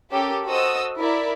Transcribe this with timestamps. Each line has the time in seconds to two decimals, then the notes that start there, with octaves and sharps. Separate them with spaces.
0.12 C#4 G4 A4 A#4
0.47 F#4 A4 C5 D#5 D#6 E6
0.99 E4 A#4 D5 E5